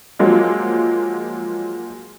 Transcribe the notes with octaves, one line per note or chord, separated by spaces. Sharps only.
F3 F#3 G#3 A#3